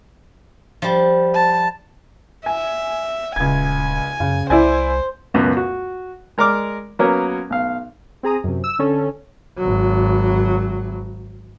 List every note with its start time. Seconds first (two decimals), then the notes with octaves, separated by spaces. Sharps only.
0.82 F3 G3
1.34 A5
2.46 E5 G#5
3.36 D#1 C#2 G#5 G#6
4.20 F#2 C#3
4.50 C2 E4 C5 D5 G#5
5.34 C#2 F#2 B2
5.57 F#4
6.38 G#3 A#4 D5 D6 F6
6.99 F#3 A#3 B3 C#4 A#4
7.50 B1 F5
8.23 C4 G#4 A#5 D#6
8.44 F#2 C3
8.64 E6
8.79 D3 C#4 A4
9.58 G#1 F#3